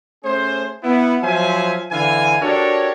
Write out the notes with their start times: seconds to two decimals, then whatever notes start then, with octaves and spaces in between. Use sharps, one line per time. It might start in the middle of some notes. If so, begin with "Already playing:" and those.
0.25 A3 C#4 G#4 C5
0.83 B3 E4
1.24 F3 F#3 C5 E5 G#5
1.92 D3 E3 F5 G#5
2.42 D4 F#4 G4 A4 A#4 C#5